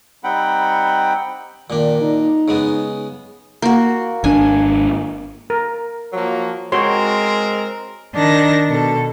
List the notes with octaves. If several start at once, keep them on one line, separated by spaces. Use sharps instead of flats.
G3 C4 D#4 F#5 G5 B5
A#2 D#3 D4
D#4
C#3 G#3 B3
A#3 F#4
G#1 D4 G#5
A#4
F3 F#3 A#3
G#3 C4 F#4 A#4 C#5 C6
D#3 D4 A5 A#6
B2 A4